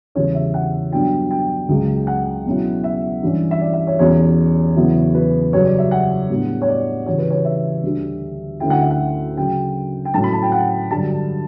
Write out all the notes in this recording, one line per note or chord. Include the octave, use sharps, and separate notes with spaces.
E2 C#3 G3 C#4 E4 C#5
E5
F#5
G2 F#3 B3 D4 G5
G5
C#2 C#3 F#3
F#5
B2 F#3 C#4 E4
E5
G2 E3 G3 C#4
E5
D5
E5
C#5
E2 B2 G3 C#4 C#5
E2 C#3 F#3 B3 E4
B4
F#2 C#3 G3 C#5
D5
E5
F#5
A2 G3 B3 D4
C#5
D5
C#3 E3 G3 C#5
B4
C#5
E5
D2 D3 G3 D4
D2 D3 A3 C#4 E4 G5
F#5
E5
F#5
C#3 F#3 C#4 G5
G5
A2 F#3 C#4 A5
B5
A5
G5
F#5
G2 D3 F#3 A5